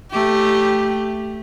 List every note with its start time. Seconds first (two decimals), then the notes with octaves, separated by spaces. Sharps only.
0.11 A3 G4